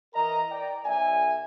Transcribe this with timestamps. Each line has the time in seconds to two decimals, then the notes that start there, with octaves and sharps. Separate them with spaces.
0.14 E3 A#4 D#5 A#5
0.51 D5 G5
0.84 B1 E5 G#5